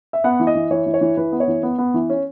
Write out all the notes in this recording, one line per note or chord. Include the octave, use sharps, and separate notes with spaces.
E5
B3 F#5
E3
D#5
E3
E3 C#5
E3
C#5
E3
E3 B4
B3
C#5
E3
B3
B3
E3
C#4